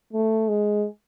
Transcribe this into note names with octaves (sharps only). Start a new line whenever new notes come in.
A3
G#3